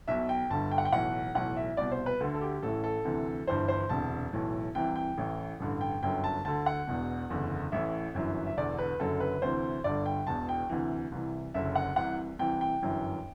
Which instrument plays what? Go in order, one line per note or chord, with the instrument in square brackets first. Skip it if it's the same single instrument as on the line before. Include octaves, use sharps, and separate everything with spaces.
[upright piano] B1 B2 E5
G5
G1 G2 D3 A5
G5
F#5
G5
B1 A2 E3 F#5
B1 A2 E3 F#5
E5
C2 B2 D5
C5
B4
D2 D3 A4
A4
G4
A1 A2 E3 A4
A4
D2 C3 E3
G1 G2 E3 C5
C5
E1 D2 C3 A5
B1 A2 E3
C2 C3 E3 G5
G5
A1 A2 E3
A1 G2 D3
G5
G1 F#2 D3 G5
A5
D2 D3 A5
F#5
E1 E2 B2
F#1 E2 D3
A1 A2 E3 E5
G1 F#2 E3
E5
E1 E2 D3 D5
B4
F#1 F#2 D3 A4
B4
D2 C3 E3 C5
G1 G2 D3 D5
G5
E1 E2 B2 A5
G5
D2 C3 E3
C2 C3 E3
F#1 F#2 D3 E5
F#5
C2 C3 E3 F#5
C2 C3 E3 G5
G5
G1 F#2 E3